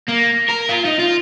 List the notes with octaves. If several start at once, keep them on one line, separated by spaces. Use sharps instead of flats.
A#3
A#4
F4
D#4
F4